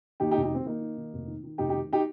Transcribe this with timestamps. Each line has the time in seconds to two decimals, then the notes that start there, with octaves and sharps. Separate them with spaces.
0.20 D#2 D#4 G4
0.31 D#4 G4
0.35 F1
0.42 D#4 G4
0.51 D#3 C4
0.66 D#3 A#3 D#4
0.82 D#3
0.97 D#3
1.13 F1
1.28 D#3
1.44 D#3
1.58 F1 D#4 G4
1.69 D#4 G4
1.73 D#3
1.93 D#4 G4